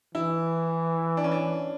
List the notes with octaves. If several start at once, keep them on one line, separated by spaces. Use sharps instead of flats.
E3 E4
D4
C#4
D4